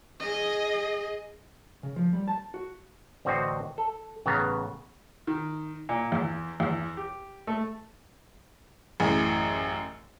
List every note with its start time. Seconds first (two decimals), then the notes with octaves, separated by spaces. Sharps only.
0.20 G#4 D#5
1.83 C#3
1.96 F3
2.13 G3
2.28 A5
2.54 F#4
3.25 A1 D3 C4 F#4 C5 D#5
3.78 A4
4.26 A1 C#3 B3 C#5 A#5
5.27 D#3
5.89 A#2
6.12 E2
6.60 E2
6.97 G4
7.47 A3
9.00 A1 F#2 E3 G#4